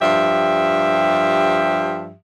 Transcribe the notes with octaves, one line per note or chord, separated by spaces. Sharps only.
G2 F3 G4 E5